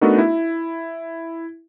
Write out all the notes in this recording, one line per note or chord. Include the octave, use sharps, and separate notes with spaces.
A3 B3 D4 D#4 F#4 A#4
E4